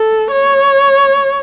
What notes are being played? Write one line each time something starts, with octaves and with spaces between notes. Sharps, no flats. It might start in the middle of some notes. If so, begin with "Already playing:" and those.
Already playing: A4
C#5